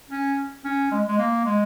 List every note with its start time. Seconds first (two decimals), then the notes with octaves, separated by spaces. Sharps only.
0.10 C#4
0.65 C#4
0.92 G#3
1.07 G#3
1.18 A#3
1.45 G#3